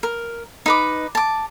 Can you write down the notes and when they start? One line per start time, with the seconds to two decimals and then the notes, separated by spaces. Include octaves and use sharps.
0.03 A#4
0.66 D#4 B4 D6
1.15 A5 D6